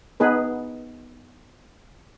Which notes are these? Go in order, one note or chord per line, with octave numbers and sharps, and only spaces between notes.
B3 D#4 G#4 B4